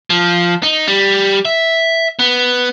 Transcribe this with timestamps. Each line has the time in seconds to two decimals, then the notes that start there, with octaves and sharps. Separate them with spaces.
0.10 F3
0.63 D#4
0.88 G3
1.45 E5
2.19 B3